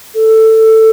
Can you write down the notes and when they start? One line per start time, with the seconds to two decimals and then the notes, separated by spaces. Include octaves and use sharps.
0.15 A4